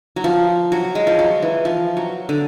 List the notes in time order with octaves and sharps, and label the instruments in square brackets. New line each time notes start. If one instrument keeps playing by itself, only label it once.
[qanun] F#3
F3
F#3
G#3
F3
F#3
E3
F3
F#3
D3